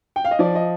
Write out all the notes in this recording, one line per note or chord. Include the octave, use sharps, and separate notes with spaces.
G5
F5
D#5
F3 D5
D#5